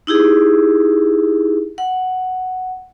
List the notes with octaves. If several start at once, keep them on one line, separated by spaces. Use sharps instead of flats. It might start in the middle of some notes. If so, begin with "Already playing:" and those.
D#4 E4 G4 G#4
F#5